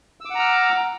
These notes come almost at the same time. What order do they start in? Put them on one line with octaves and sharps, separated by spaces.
E6 D6 F#5 A#5 F6